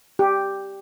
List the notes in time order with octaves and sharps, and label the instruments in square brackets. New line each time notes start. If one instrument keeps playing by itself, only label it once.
[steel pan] G4